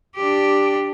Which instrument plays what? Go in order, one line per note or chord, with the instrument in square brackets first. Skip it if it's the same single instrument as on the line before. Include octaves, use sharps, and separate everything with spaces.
[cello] D4 G4